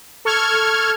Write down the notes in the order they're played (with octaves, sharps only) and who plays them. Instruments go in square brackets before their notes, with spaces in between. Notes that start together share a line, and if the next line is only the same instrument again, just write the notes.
[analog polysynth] A4 C#6 F6 G#6